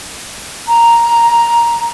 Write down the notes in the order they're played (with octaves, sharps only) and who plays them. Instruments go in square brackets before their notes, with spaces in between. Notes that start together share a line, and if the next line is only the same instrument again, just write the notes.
[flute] A#5